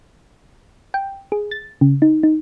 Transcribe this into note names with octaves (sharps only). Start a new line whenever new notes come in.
G5
G#4
A6
C#3
D#4
D#4